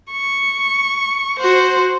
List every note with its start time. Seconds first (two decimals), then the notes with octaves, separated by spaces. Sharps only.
0.11 C#6
1.39 F#4 C5